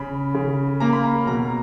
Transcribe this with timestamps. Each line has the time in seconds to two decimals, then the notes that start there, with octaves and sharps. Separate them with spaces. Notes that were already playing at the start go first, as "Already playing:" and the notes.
Already playing: C#3 B5
0.34 C#3
0.80 A#3 A#5
0.93 B5
1.04 A#5
1.27 B2 A#5